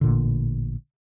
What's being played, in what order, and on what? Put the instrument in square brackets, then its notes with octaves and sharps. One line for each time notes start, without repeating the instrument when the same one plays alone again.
[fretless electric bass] A1 A#2 D3